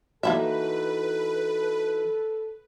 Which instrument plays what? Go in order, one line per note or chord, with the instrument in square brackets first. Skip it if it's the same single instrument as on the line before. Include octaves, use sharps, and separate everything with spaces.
[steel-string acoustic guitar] E3 D#4 F#4 [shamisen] A#3 E4 E5 [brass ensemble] A4 [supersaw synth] B4